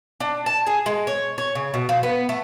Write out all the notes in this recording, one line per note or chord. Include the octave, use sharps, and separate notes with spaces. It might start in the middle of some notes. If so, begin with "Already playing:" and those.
D4
A5
G#4
G#3
C#5
C#5
C#3
B2
F3
B3
A3